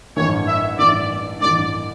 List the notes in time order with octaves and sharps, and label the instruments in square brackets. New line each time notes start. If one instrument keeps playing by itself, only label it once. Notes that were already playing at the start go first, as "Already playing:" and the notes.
[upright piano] A1 G2 E3 [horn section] C#5
[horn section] E5
[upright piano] A1 G2 E3 [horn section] D5
[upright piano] A1 G2 E3 [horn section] D5